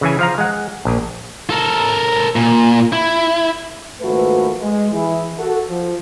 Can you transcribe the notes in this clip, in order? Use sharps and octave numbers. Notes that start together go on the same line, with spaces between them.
C#3 E3 G#5
F3 F5 A#5
G#3 F#5
A#1
A4 A#4
A#2
E4
G#1 F2 A3 A#3 F#4 B4
G#3
E3 E4 G#4
F#4 A4
F3